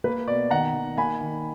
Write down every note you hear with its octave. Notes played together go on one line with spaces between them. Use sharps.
A#3 B4
B2 D5
D#3 F#5 A#5
D#3
A#3 G#5 B5
D#3